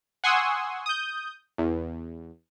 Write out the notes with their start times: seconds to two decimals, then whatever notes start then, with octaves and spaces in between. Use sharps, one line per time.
0.24 F#5 G#5 C6 C#6 D#6 E6
0.86 D#6 G6
1.58 E2